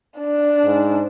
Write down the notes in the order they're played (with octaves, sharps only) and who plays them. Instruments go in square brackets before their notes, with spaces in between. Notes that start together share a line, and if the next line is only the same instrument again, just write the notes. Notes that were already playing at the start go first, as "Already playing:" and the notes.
[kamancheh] D4
[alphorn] G#2